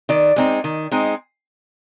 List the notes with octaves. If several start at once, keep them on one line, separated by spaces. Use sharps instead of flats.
D#3 D5
G#3 C4 D#4
D#3
G#3 C4 D#4